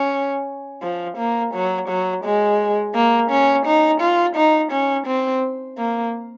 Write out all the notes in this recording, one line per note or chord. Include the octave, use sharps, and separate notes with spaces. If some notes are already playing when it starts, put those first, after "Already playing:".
Already playing: C#4
F3
A#3
F#3
F#3
G#3
A#3
C#4
D#4
F4
D#4
C#4
C4
A#3